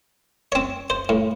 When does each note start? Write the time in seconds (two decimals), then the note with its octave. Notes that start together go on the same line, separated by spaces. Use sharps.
0.52 C4 C#5
0.90 C5
1.09 A2